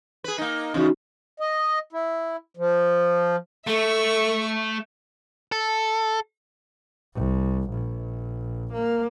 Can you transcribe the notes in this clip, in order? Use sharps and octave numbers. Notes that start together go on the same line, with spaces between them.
G#4 B4
A#3 D#4
E2 C#3 F3 C#4 D#4 F#4
D#5
E4
F3
A3 A4 E5 C#6
A4
C2
A#1
A#3